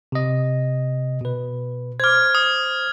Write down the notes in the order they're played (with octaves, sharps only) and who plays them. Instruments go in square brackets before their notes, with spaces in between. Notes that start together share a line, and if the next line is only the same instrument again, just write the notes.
[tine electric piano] C3 D#5
B2 B4
[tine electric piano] C5 D6 [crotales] F6 G#6
[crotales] D#6